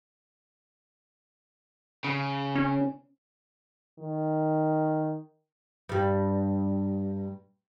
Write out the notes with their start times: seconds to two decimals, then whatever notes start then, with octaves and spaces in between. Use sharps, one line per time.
2.04 C#3
2.55 C#4
3.99 D#3
5.89 G2 G3